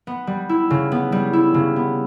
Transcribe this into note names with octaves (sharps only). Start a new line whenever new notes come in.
B3
G3
E4
C#3
B3
G3
E4
C#3
B3